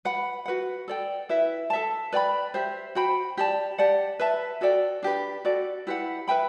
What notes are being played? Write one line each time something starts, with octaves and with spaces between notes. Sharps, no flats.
B4 F#5 B5
F#4 B4 F#5
A4 D5 G5
E4 B4 E5
A4 E5 A5
B4 D5 G5 B5
G4 C5 E5
F#4 C5 G5 B5
G4 D5 A5
G4 D5 F#5 A5
B4 E5 A5
F#4 A4 D5 G5
D4 G4 B4
F#4 A4 D5
E4 G4 B4 F#5
B4 E5 G5 B5